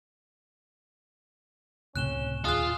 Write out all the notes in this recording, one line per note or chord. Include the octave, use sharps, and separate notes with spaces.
C#2 A2 C3 C#4 F#6 E7 G7
D#1 F4 G#4 D#6 F#6